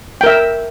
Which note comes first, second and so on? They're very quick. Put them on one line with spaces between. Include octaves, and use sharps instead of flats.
G5 A#4 E5